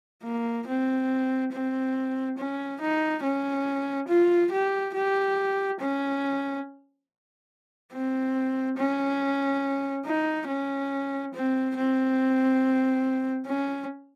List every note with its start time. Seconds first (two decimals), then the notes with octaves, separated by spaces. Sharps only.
0.24 A#3
0.67 C4
1.52 C4
2.38 C#4
2.81 D#4
3.23 C#4
4.08 F4
4.52 G4
4.94 G4
5.80 C#4
7.92 C4
8.78 C#4
10.05 D#4
10.48 C#4
11.34 C4
11.77 C4
13.47 C#4